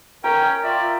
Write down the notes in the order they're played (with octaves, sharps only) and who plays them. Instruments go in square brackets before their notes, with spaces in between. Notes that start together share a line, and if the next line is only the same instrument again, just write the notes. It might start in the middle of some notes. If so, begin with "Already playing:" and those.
[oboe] C#4 [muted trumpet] A#4 [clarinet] G5 [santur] A#5
[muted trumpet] F4 [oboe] D5 [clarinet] E5